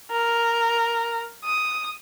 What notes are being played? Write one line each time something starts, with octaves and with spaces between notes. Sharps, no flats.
A#4
D#6